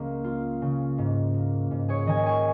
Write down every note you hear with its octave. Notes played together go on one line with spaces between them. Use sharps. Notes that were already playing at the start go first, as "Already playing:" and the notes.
Already playing: C#2 A#3
F4
C#3
G#2
A#3
G#2
G#4 C#5
D#3 D#5 G#5
G#5 C#6